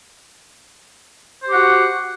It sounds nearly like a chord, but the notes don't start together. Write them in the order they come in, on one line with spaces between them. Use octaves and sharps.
C5 G4 F#5 F#4